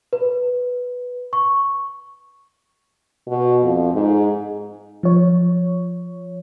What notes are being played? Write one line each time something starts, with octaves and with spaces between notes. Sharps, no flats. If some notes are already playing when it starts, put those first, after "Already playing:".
B4
C#6
B2
F2
G#2
F3 C#5